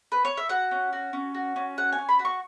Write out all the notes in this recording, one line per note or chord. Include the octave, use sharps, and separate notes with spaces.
B4
C#5
E5
F#4 F#5
C#4
F#4
C#4
F#4
C#4
F#4 F#5
G#5
C#4
B5
F#4
C#6